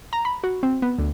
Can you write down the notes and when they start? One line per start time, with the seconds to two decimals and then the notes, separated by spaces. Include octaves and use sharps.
0.13 A#5
0.25 B5
0.44 F#4
0.63 C4
0.82 B3
0.98 D2